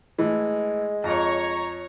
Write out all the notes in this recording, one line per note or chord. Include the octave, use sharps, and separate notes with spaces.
A2 E3 G#3
F2 C#5 A#5